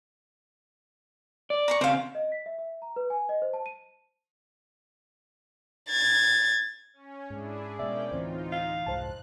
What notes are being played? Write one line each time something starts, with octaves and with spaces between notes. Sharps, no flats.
D5
A#5 C6 C#6
C#3 C4 C5 F5
D#5
B6
E5
E5
A#5
B4
G#5
D#5
C5
A5
D#7
G#6 A6
C#4
G#2 D4 E4 G#4
B2 G#3 A#3 C#4 D5 E5 G5
D2 A2 E3 C4 D#4 F4 C5
F5
C2 F2 G#2 C5 A5 F#6